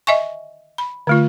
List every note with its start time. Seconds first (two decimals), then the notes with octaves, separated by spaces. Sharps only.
0.07 D#5 E5 G#5 C#6
0.78 B5
1.07 D3 A3 F4